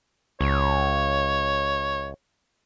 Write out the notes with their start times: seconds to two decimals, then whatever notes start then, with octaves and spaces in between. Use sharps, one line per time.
0.41 C#2 C#5